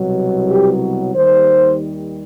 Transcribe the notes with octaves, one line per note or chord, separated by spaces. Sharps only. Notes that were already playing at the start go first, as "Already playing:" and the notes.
Already playing: C2 B2 F#3
G4
D#2 D#3 G3 C5